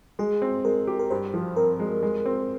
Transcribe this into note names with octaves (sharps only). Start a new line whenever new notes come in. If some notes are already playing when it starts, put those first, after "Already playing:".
G#3 G#4
C4
G#3 A#4
G4
A#4
G2 C5
F3
C4 A#4
G#3
G#3
C4